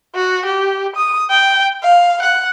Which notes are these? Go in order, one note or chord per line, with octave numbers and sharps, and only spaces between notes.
F#4
G4
D#6
G5
F5
F#5